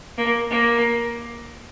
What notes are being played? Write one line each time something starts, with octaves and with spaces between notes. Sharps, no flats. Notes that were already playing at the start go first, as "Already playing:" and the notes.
A#3
A#3